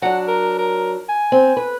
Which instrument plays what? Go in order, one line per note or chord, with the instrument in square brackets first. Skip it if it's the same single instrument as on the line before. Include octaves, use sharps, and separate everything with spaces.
[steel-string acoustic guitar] F#3 D4 [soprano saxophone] F#5
[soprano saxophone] A#4
A#4
G#5
[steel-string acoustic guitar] C4
B4